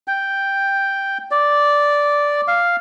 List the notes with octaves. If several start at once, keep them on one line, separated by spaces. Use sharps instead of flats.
G5
D5
F5